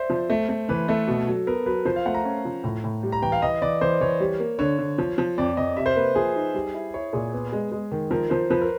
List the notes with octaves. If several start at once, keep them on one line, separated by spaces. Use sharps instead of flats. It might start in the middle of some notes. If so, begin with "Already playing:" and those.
Already playing: C5 D5 E5
F3
A3
A3
E3 B4
A3 A4
B2
F#3
B3 A#4
F#3 B4
F3 C5
F5
A3 F#5
A#5
C#4
F3
A2
A2
G3
A#5
E3 G5
F5
E3 D#5
E3 D5
E3 C5
E3 C#5
G3
A#3
D3 C#5
D3
F3
F3
F2 D5
F2 D#5
C3 E5
C5
A#3 B4
F3 G#4
D#4
G3
E4
E4 C#5
A#2 G#4
B3
G#3
G#3
D#3
F3 A#4
F3 C5
F3 B4
A#4